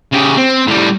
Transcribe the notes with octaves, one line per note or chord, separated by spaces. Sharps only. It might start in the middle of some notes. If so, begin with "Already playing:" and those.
C#3 G4
C4
A2 G3